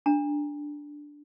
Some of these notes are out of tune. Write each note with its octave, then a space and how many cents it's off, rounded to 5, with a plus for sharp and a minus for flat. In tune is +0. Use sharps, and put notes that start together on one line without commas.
D4 +0 A#5 +0